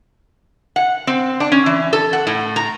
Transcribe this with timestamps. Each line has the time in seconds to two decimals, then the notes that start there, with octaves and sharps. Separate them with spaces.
0.76 F#5
1.07 C4
1.40 D4
1.52 C#4
1.66 E3
1.93 A4
2.13 F#5
2.27 A2
2.56 A#5